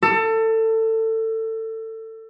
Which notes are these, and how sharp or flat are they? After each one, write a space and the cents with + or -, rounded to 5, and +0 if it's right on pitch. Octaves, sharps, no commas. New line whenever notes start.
A4 +25